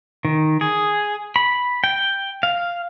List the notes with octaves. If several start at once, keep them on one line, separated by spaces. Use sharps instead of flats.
D#3
G#4
B5
G5
F5